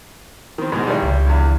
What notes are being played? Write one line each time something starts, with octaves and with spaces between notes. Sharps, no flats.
D#3 C4
G#2 B2 G#3
G#1 D#3 G3
C#2
E2 G2